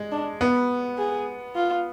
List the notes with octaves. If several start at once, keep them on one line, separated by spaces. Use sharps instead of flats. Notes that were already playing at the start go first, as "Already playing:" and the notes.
Already playing: G#3
D4
B3
G#4
F4